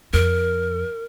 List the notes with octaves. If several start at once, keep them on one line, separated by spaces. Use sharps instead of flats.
F2 A#4